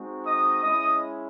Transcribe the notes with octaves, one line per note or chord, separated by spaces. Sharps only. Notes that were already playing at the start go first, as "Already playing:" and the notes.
Already playing: G#3 C4 D#4 F#4
D#5 D#6
G#3 C#4 E4 D#5 D#6